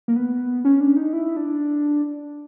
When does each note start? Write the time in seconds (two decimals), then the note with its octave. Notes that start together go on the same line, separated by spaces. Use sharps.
0.08 A#3
0.16 B3
0.65 C#4
0.81 D4
0.96 D#4
1.13 E4
1.37 D4